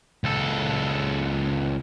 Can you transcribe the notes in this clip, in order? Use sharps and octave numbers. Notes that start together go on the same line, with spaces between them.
C#2 A4